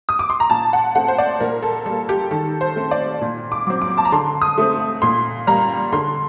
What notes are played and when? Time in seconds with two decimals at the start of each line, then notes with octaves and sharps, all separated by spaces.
0.09 D#6
0.19 D6
0.30 C6
0.40 A#5
0.50 A#2 A5
0.73 F#5
0.95 A3 C4 F#5
1.08 C5
1.18 D5
1.40 A#2 A#4
1.63 A4
1.86 G3 A#3 A4
2.09 G4
2.31 D#3 A4
2.61 C5
2.76 A3 C4
2.91 D5
3.21 A#2
3.52 D6
3.67 F#3 C4
3.82 D6
3.98 A5
4.05 A#5
4.12 D3 C6
4.42 D#6
4.58 A3 C4
5.02 A#2 C6
5.47 G3 A#3 A#5
5.93 D3 C6